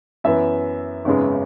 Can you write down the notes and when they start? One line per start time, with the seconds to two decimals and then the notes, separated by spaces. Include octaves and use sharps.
0.24 F#2 E3 B3 E5
1.05 G#1 F#2 C#3 G#3 B3